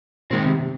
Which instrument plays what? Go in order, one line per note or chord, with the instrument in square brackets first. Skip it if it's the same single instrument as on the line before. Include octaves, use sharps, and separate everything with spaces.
[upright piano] A#2 [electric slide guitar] D#3 G#3 C4
[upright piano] C3
C3